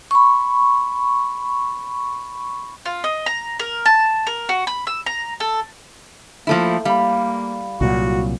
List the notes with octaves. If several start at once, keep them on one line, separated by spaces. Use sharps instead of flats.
B5 C#6
F4
D#5
A#5
A#4
A5
A#4
F#4
B5
E6
A#5
A4
F3 A3 A#3 E4
G3 A#3 F5 B5
C2 A#2 F#3 F#4